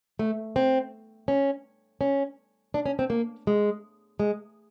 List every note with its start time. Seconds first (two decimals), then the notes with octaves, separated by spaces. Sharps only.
0.19 A3
0.56 C4
1.28 C#4
2.01 C#4
2.74 D4
2.86 C#4
2.99 C4
3.10 A#3
3.47 G#3
4.19 G#3